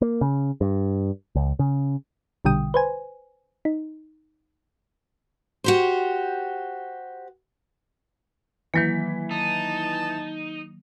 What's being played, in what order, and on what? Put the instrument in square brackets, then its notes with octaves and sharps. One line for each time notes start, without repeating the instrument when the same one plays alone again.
[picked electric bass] A#3
C#3
G2
C#2
C#3
[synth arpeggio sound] A#1 B2 D3 G3 G5 D#6
B4 C5 G#5
D#4
[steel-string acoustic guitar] F#4 G4 C5
[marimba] D#3 F#3 A#3 [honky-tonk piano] E3 B6
[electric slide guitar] D#4 [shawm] A5